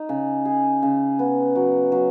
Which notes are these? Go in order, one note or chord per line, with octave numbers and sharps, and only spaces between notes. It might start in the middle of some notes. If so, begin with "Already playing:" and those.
Already playing: D#4
C#3
G#4
C#3
B3
F#3
F#3